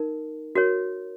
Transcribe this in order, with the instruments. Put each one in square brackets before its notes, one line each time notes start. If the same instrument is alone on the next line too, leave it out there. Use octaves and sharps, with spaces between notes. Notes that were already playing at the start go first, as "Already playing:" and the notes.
Already playing: [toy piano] D#4 A#4
F#4 A#4 C#5